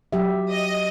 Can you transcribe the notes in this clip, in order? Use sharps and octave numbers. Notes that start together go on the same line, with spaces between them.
F#3 G4 E5
D#5